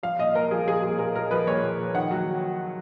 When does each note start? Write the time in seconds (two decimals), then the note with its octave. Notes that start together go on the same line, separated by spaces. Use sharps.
0.03 F3 F5
0.19 A#2 D#5
0.35 A#2 A#4
0.51 F3 G#4
0.68 F3 G#4
0.83 A#2 G#4
0.99 A#2 A#4
1.14 F3 A#4
1.31 F3 B4
1.47 A#2 C#5
1.63 A#2
1.79 F3
1.95 D#3 F#5
2.11 F#3